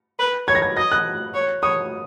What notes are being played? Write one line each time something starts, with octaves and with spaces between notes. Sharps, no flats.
B4
C#5 G#6
A#6
G#6
D#5 A#6
F#6
C#5
C#5 D#6